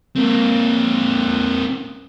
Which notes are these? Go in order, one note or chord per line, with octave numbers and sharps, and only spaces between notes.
A#3 C4